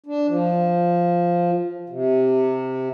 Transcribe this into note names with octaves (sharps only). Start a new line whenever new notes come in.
D4
F3
C3